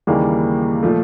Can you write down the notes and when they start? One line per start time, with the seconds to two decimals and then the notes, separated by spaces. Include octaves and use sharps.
0.07 D#2 C#3 E3 G3 A#3
0.83 A#2 F3 A3